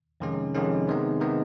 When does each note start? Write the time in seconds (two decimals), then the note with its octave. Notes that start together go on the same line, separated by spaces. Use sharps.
0.20 F2 C3 D#3 G#3 C#4
0.54 F2 C3 D#3 G#3 C#4
0.87 C3 D#3 G#3 B3 D#4
1.20 C3 D#3 G#3 B3 D#4